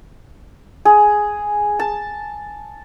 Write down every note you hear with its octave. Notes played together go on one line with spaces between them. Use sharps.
G#4
A5